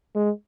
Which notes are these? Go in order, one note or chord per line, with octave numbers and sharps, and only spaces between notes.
G#3